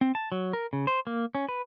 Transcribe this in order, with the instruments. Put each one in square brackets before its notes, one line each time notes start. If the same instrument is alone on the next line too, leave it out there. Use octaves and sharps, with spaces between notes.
[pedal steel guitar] C4
A5
F#3
A#4
C#3
C5
A#3
C#4
B4